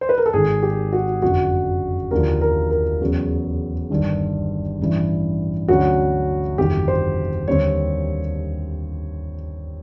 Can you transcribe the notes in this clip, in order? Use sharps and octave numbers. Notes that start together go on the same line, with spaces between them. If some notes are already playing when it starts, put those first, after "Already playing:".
C5
B4
A#4
A4
G#1 G#2 D#3 G#4
G4
F#4
F#1 F2 D3 F#4
D#2 D3 F3 A#4
A#4
A#4
E2 C#3 F#3
G1 G2 D#3
A1 G2 E3
D2 D3 F#3 A3 C#4 F#4
G1 F2 C3 D#3 G4
C5
D#2 D3 G3 C4 C#5